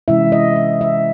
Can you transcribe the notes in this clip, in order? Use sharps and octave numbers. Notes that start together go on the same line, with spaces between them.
C3 E3 G#3 C#4 E4 E5
D#5
E5
E5